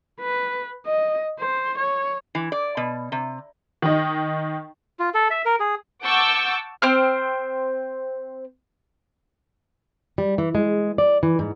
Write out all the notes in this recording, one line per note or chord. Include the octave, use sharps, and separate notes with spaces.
B4
D#5
C5
C#5
E3
D5
B2
C3
D#3 D#5
F4
A4
E5
A#4
G#4
F#5 A5 C#6 D6 E6 G6
C4 C5 F6
G3
E3
G#3
D5
E3
G#2